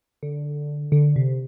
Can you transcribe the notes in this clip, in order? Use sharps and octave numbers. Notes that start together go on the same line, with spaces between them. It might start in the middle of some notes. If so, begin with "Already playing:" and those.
D3
D3
C3